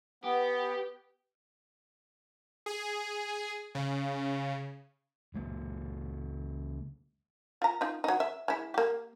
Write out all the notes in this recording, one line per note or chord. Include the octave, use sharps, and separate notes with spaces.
B3 G4 B4
G#4
C#3
C#2 G#3 A#3
F4 A#5
D#4 F4
F#3 D#4
E5
G#3 E4
A#3 G4